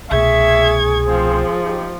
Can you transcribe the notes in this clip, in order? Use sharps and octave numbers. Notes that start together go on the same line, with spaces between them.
C2 B2 A3 G#4 E5 C#6 G#6
F3 C4 F4 C5
D#4 G4